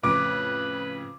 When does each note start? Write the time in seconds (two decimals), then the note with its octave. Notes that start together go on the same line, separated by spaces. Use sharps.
0.04 F2 A2 C#3 B4 D6